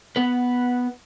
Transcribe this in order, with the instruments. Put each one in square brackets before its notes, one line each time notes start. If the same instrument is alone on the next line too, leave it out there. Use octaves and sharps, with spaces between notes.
[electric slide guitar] B3 B4